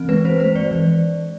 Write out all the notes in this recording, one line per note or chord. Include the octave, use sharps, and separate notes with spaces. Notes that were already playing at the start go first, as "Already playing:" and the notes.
Already playing: E3 C4
G#3 B4
C4 C5
G#3 C5
G#3 D5
E3